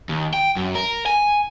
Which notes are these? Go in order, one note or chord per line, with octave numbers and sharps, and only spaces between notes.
D#2
G5
F#2
A#4
G#5